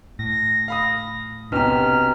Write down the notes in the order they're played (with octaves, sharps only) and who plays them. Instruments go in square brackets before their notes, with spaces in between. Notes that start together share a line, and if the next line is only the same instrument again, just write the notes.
[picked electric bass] A2 [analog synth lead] A#6
[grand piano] F5 B5 D#6
[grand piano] B1 F#2 C3 [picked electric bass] D4 [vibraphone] B4 G5 A#5 [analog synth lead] F6